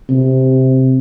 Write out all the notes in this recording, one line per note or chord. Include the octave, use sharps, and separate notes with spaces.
C3